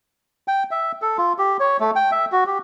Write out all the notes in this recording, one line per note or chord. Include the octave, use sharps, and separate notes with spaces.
G5
E5
A4
F4
G4
C#5
A3
G5
E5
F#4
G4